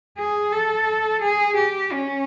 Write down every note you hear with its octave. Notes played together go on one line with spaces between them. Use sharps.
G#4
A4
G#4
G4
C#4